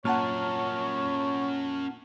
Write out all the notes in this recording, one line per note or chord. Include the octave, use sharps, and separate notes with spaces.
A#2 C#4 A#4 C#5 F#5 A5 F6